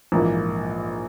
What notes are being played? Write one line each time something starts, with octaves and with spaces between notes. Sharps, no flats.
A#1 G#2 E3 A#3